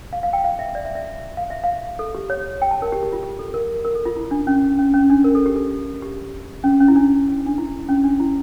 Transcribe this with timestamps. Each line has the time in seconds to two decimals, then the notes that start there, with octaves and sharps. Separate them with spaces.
0.13 F5
0.23 F5
0.33 G5
0.44 F5
0.59 E5
0.75 D5
0.85 E5
0.95 E5
1.37 F5
1.50 E5
1.64 F5
1.99 A4
2.15 G4
2.30 C#5
2.62 G5
2.71 A5
2.82 A#4
2.92 G4
3.03 G4
3.13 F4
3.23 G4
3.39 A4
3.54 A#4
3.85 A#4
3.95 A4
4.05 F4
4.16 E4
4.31 D4
4.47 C#4
4.79 C#4
4.94 C#4
5.10 D4
5.24 A#4
5.35 A4
5.46 G4
5.56 A4
6.02 G4
6.64 C#4
6.80 C#4
6.88 E4
6.96 D4
7.46 D4
7.58 E4
7.89 C#4
8.04 D4
8.20 E4